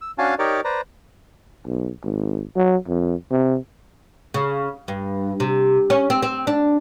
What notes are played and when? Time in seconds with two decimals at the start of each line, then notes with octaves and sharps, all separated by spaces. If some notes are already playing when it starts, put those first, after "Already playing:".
0.01 E6
0.18 C#4 D4 F#4 F5 G#5 A5
0.39 D#4 G4 A#4 C#5 D5 D6
0.65 B4 C5 D5 A#5
1.66 B1
2.03 G#1
2.56 F#3
2.88 F2
3.30 C3
4.34 C#3
4.88 G2
5.40 C3
5.90 C#4
6.10 C4
6.23 C4
6.47 D4